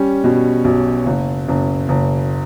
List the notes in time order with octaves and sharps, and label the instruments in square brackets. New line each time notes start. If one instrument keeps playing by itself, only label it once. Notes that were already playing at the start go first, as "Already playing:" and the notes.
Already playing: [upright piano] G3 C#4
B2
B1
F#1
F#1
F#1